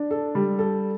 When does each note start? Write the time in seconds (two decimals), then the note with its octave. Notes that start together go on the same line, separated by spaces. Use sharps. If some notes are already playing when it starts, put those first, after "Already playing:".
Already playing: D4
0.11 A4
0.35 G3
0.59 A4